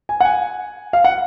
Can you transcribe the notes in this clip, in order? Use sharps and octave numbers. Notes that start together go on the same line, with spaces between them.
G#5
F#5
G#5
F5
F#5